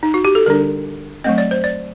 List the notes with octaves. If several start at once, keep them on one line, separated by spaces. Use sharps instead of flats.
D#4
F#4
G4
A4
D3 G3 D4 A#4
F#3 A3 C4 D#5
D5
C5
D5